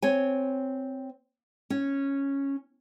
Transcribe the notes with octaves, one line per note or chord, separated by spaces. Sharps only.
C4 C#5 G#5
C#4